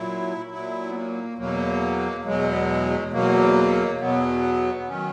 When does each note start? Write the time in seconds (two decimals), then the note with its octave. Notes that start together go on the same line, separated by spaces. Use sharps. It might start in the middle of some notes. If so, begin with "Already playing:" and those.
Already playing: A#2 F#3 E4
0.51 A#2 F#3 E4
0.89 B3
0.95 A#3
1.38 E2 B2 F#3 A#3
2.25 E2 B2 F#3 G#3
3.13 E2 B2 F#3 A#3
4.00 E2 B2 F#3 B3
4.77 B3
4.88 D#3 F#3 C#4